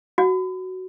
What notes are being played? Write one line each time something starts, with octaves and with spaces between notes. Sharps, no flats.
F#4